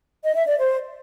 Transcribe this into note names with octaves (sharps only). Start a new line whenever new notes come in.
D#5
E5
D5
C5